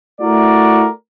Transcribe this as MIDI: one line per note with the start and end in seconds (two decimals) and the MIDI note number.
0.21 0.88 57
0.21 0.88 64
0.21 0.88 66
0.21 0.88 70
0.21 0.88 74